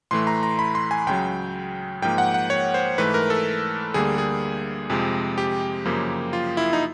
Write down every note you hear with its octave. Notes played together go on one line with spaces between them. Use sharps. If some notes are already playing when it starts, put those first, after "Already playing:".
A2 E3 A3 C6
A#5
A#5
B5
C6
G#5
C#2 C#3 F#3 G5
G#2 F3 A#3 G5
F#5
F#5
C#5
C5
G#2 E3 A3 B4
A#4
A4
D2 D3 G3 A#3 G#4
G#4
F2 C3 F3 G#3
G4
F#2 C#3 F3 A#3
F4
E4
D#4